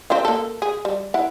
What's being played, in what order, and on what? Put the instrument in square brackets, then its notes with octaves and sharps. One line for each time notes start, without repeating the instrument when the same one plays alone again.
[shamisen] C4 C#4 F4
A#3 A4
G#4
G3
E4 F#5